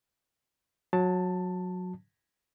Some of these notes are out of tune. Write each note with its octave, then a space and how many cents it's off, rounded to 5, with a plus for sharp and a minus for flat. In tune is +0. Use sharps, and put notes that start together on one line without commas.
F#3 -20 A5 +10